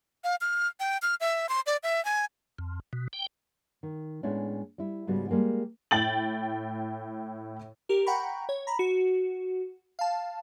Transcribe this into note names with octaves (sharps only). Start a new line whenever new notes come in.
F5
F6
G5
F6
E5
C6
D5
E5
G#5
F2
B2
G5
D#3
A2 G#3 A3 B3 C#4 D4
G3 E4
G#2 C#3 G3 B3 F#4
G3 G#3 A#3 G#4 G5
A2 G5 A6 F#7
G4 A#4
F#5 G5 A#5 B5 C#6
C#5
A#5 B5
F#4
F5 A5